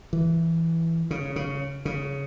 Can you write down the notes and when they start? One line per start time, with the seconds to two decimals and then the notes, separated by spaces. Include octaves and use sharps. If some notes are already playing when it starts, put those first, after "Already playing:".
0.13 E3
1.11 C#3
1.36 C#3
1.85 C#3